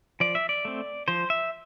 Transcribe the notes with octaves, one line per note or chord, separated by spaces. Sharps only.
F3 D5
E5
D5
A3 C4
F3 C5
E5